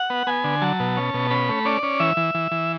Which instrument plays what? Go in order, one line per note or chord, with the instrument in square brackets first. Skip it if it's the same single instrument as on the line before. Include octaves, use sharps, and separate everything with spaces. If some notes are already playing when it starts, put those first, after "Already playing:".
Already playing: [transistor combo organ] F#5
B3
B3 G#5
D3
F#3 A5
B2
C#4
B2
C#4 B5
A3
C#4 D5
C#4
E3 E5
E3
E3
E3